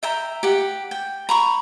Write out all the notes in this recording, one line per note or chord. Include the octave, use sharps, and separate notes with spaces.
E5 G5 A#5
G4 F#5
G5
A#5 B5 C#6